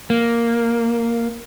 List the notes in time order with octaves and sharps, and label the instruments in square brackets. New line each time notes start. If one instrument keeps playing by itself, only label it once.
[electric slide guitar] A#3